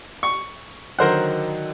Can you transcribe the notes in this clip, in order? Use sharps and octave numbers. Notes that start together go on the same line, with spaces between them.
C#6
D3 D#3 F#3 A#4 C5 F#5